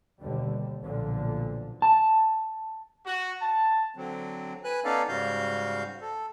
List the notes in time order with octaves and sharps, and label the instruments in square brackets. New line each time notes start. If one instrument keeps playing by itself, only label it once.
[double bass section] D#2 B2 D3 G3
B1 A#2 D3 F3
[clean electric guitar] A5
[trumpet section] F#4
A5
[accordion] D3 F#3 C4
B4 G#5 F#6
B3 C#4 D#4 A4 D5 F5
G#2 C#3 G3 F#4 F5 G6
A4